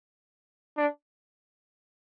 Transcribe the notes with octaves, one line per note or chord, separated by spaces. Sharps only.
D4